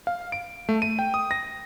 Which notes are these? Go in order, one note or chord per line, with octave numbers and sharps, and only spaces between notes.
F5
D7
A3
D#7
G5
D#6
A#6